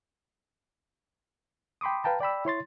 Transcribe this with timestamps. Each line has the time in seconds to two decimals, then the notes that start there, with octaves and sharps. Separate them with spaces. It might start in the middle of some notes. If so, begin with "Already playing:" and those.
1.81 G5 B5 C6 D6 D#6
2.04 B4 F5 G5 A5 A#5
2.20 D5 G5 B5 E6
2.45 E4 C#5 C6 A6